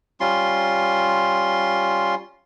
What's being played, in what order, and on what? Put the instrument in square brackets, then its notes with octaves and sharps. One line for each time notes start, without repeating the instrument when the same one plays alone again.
[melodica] G3 C#4 F4 C6